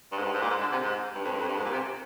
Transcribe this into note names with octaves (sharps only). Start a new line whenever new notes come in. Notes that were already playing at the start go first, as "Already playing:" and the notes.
G2
G#2
G2
G#2
A#2
G#2
D3
C3
G#2
G2
F2
G2
F2
G2
G#2
A#2
C3